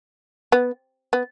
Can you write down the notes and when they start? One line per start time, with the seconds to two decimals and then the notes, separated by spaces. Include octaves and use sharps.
0.52 B3
1.13 B3